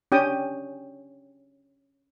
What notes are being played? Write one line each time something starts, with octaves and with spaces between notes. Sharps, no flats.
C#4 D4 G4 G5 D#6